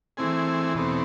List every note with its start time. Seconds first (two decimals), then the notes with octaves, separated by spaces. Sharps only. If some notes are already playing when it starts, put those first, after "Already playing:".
0.17 E3 A3 C4 G#4
0.74 E2 B2 A3 C4